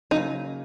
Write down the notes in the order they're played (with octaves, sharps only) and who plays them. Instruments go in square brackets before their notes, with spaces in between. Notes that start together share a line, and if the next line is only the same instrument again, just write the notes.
[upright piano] C#3 F#3 A#3 [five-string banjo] D#4